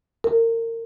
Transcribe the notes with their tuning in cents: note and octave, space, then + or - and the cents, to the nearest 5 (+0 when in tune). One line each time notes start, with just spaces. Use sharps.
A#4 -30